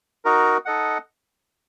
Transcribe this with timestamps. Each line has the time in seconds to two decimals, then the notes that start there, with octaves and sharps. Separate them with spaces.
0.25 D#4 F#4 A#4
0.65 D#4 A4 D#5 F#5